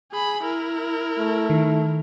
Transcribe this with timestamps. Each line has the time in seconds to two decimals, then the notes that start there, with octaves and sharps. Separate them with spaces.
0.12 G#4 B5
0.43 E4 A#4
1.18 A3
1.50 D#3